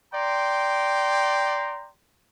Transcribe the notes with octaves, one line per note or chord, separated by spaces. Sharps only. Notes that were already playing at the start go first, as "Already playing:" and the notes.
D5 G5 A#5 C6